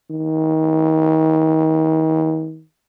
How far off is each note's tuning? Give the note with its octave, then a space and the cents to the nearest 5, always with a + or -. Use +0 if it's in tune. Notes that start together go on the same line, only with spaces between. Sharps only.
D#3 +35